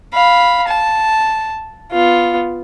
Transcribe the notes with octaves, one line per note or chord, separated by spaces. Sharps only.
F5 B5
A5
B3 F4